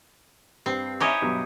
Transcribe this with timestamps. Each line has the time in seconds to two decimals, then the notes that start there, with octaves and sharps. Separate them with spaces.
0.66 G2 C4 C7
1.00 C#4 D#4 E4 G4 C#5 D#5
1.22 G2 B2 F#3